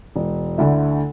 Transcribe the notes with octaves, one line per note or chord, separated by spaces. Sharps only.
E1
D2 D3 A3 E4